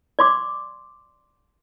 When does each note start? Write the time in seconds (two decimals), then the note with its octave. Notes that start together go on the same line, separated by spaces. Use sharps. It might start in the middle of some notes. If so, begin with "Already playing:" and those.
0.19 D5 C6 D6